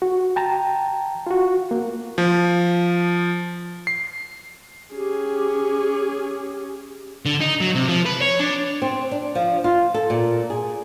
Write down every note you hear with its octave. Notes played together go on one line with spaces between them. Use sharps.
F#4
G5 A5 A#5
F4 F#4
A#3
F3
C7
C#4 G4 G#4
D3
D#4
F#3
C3
F3
B4
C#5
D4
C4
D4
F3
F4
A4
A#2
G#4